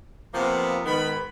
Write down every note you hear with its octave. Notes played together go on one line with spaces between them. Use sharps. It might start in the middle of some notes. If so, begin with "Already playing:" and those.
C3 F3 A#3 B3
G#2 D#3 B3 B5